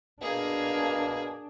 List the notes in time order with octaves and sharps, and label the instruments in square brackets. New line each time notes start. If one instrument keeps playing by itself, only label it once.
[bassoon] B2 [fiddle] A#3 G#4 [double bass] D4